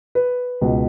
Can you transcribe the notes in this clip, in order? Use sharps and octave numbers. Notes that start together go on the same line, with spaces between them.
B4
C#2 B2